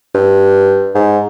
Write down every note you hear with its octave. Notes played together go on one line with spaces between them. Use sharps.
G2
G#2